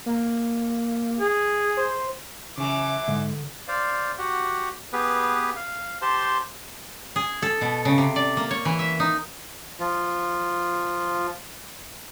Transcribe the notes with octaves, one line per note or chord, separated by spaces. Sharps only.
A#3
G#4
C5
F#2 C#3 E3 D6
G#2 D3
C5 D5 F5
F#4 G4 F#5
B3 G4 G#4 B4
F5
G4 C5 A5 C6
G#4
A4
B2
C#3
C3
D5
A#3
C#5
E3
E5
D#4
F3 F4